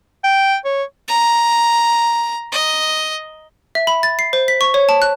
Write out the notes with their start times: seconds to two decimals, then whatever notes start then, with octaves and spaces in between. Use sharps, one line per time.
0.24 G5
0.65 C#5
1.08 A#5
2.52 D#5
3.75 E5
3.87 B5
4.03 A6
4.19 C7
4.33 C5
4.48 B6
4.61 C#6
4.74 C#5
4.89 A5
5.02 F#6